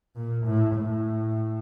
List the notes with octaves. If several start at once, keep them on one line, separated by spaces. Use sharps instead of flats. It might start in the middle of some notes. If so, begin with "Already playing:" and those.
A#2
A2
A2